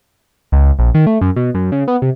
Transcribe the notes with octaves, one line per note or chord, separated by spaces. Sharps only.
C#2
A#1
D#3
A3
F#2
B2
F#2
C#3
B3
C3